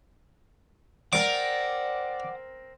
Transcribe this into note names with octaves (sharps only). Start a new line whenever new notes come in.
C4 A#4 D5 F#5 D6